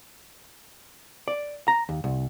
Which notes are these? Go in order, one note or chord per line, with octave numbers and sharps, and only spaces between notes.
D5
A#5
D#2
C2